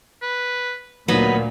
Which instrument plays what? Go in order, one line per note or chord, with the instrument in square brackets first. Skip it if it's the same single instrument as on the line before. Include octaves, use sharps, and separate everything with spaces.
[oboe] B4
[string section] D2 A#2 [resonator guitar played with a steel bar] F#3 B3 D#4 [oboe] B5